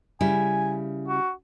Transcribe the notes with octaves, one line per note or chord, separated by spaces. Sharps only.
C#3 G3 E4 G#5
F#4